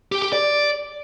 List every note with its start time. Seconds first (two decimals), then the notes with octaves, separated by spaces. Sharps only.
0.12 G4
0.22 G4
0.32 D5